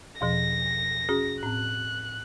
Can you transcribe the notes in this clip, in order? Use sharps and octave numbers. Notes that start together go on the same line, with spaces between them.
E2 B2 F3 A#6
C#4 F#4 G#4
A2 C4 F#6